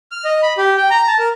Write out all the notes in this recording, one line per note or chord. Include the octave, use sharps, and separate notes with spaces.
F6
D#5
B5
G4
G5
A#5
A5
A#4